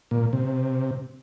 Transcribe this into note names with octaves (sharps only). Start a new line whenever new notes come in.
A#2
C3